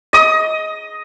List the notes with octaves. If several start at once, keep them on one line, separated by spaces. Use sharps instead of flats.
D#5 D#6